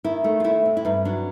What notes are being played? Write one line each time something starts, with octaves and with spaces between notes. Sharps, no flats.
D#3 E4
A3
F4
A3 E4
C3
E4
G2 D#4
F#3 D4